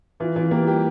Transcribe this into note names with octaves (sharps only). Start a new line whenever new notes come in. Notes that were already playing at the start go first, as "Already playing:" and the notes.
E3 F4
E3 F4
A#3 G4
G3 G4